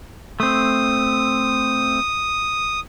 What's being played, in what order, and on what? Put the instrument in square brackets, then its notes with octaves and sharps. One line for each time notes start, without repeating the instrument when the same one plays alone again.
[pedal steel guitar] A3 C4 [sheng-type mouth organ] D#6